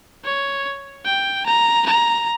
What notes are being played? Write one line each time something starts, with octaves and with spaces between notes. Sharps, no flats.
C#5
G5
A#5
A#5